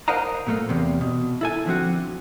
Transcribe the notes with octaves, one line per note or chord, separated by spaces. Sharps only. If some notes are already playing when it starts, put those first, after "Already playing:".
A#4 C5 D#5 F5 F#5 A#5
A#2 A3 A#3
E2 C3
B2
E4 A4 G#5
D3 F3 C4 F#4